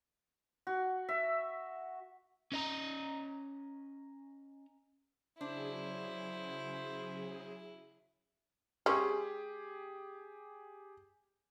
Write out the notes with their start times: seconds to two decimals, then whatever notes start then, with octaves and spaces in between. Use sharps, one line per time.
0.67 F#4
1.09 E5
2.52 C#4 D#5 A#5
5.41 C#3 F#3 D4 E4 G#4 C5
8.86 G#3 C#4 G4 G#4